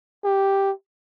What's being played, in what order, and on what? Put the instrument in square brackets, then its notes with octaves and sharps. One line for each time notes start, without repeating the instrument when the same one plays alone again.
[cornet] G4